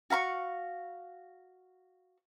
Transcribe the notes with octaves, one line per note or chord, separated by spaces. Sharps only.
F#4 F5 B5 C#6